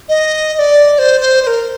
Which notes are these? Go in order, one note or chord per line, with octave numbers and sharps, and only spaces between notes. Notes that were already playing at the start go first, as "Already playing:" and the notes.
D#5
D#5
D5
C5
C5
C5
A#4